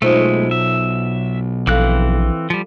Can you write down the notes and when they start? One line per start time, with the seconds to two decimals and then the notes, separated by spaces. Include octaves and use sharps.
0.02 B1 G#3 A3 D#4 F4 C5
0.51 E5
1.67 A#1 E3 C4 A4 F5 F#6
2.50 F3 G3